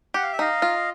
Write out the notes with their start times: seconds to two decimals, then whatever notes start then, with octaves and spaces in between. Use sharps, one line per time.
0.14 G4 F#5
0.23 F5
0.33 E5
0.39 D#4 D#5 F5
0.62 F4